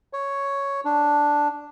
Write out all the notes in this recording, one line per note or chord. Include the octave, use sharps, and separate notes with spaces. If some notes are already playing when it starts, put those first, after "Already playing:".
C#5
D4